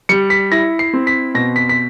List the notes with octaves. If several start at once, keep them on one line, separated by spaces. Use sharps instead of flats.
G3 C#7
B6
E4 A#6
C7
C4
B6
B2 A#6
B6
B6